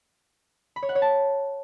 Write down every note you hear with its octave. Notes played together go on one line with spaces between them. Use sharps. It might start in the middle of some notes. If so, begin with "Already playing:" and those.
B5
C#5
F#5
C#5
A5